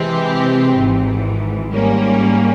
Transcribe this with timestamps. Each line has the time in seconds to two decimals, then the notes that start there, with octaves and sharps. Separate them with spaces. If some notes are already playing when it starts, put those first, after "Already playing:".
Already playing: C3 E3 G#3 C4 G4
0.77 G#1 G#2 E3
1.72 G#2 G3 A#3 C#4